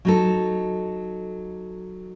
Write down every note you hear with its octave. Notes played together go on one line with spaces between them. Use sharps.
F#3 D#4 A4